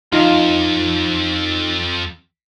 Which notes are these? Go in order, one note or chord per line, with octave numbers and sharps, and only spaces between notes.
F2 D#4 F4 D#5 F5